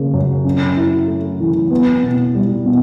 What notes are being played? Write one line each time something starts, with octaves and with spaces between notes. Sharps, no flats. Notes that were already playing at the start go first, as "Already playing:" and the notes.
Already playing: C#3 A#3
F#2
C#4
E4
A3
E3
B3
B2
G3
B2